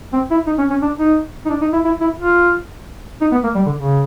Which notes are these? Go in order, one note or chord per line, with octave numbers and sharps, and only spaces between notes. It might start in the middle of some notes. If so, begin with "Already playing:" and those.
C4
E4
D#4
C#4
C#4
D4
D#4
D#4
D4
D#4
E4
E4
E4
F4
D#4
B3
A#3
G3
D3
C#3